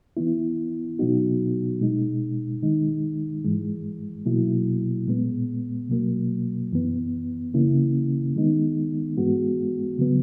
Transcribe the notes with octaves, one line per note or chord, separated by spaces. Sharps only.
E3 B3 E4
B2 F#3 B3 D#4 F#4
B2 G#3 D#4
D#3 G#3 D#4
G#2 E3 G#3
B2 F#3 A#3 E4
A#2 G#3 B3
B2 F#3 A#3
F#2 E3 B3
C#3 E3 A#3 C#4 E4
D#3 G#3 B3 D#4
G#2 E3 G#3 B3 F#4
C#3 F#3 B3